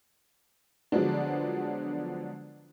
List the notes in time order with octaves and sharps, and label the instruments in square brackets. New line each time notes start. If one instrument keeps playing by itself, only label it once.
[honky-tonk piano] D3 F3 F#3 G#3 B3 D4